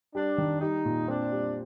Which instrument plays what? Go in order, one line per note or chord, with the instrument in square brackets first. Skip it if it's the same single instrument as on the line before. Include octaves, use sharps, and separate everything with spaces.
[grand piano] G3 [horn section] D4
[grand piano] D#3
[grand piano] G3 [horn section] D#4
[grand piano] A#2
[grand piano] C4 [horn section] D4
[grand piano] G3